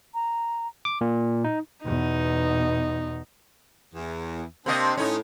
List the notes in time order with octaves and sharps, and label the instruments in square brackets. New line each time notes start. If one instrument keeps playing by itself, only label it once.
[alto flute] A#5
[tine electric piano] D6
A#2
D#4
[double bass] E2 B2 [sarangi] D#4
[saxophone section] E2
[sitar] C3 A#3 D#5 [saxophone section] C4 D4
[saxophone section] A2 [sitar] C#4 D#4